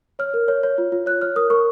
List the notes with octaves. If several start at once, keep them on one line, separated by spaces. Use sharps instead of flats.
C#5 F6
A#4
C#5
C#5
F4
F4
C#5 F#6
C#5 F6
A#4 D#6
A#4 C#6